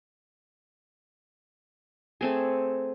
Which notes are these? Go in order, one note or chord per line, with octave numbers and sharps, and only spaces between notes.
A3 C4 G#4